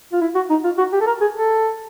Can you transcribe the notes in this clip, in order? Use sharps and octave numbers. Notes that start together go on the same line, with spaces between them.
F4
E4
F#4
D#4
F4
F#4
G4
A4
A#4
G#4
A4